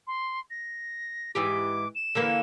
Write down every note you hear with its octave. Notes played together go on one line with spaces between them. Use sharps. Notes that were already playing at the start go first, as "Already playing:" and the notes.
C6
A#6
G#2 E3 G4 D6
E7
D3 E3 A#3